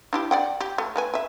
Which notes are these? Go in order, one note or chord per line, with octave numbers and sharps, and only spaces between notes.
D4 E4 G4
D5 F#5 G5
G4
A3
A3 B4 G#5
E5 G#5